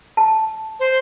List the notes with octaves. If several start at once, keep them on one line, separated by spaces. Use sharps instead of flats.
A5
C5